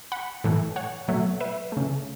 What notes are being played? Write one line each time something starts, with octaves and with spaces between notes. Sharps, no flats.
F#5 B5
A2 E3 A3
C#5 F#5
B2 F#3 A3
B4 E5
C#3 A3